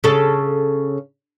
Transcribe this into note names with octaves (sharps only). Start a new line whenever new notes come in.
C#3 A4